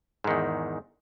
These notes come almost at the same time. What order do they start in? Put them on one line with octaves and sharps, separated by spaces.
G#2 D#3 E2